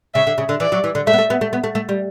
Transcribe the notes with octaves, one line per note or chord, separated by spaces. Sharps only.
C#3 E5
D3
C#3
D3
E3 D5
F#3
E3
D3
A3 E5
B3
A3
B3
A3
B3
A3
A3
G3